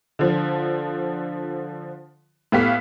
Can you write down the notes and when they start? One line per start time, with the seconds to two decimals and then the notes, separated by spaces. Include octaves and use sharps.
0.19 D3 F3
2.52 A2 B3 G4 F5 B6